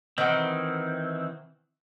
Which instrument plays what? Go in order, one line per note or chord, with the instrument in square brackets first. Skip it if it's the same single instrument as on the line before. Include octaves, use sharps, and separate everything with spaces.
[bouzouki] D#3 F#5 [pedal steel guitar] E3 C4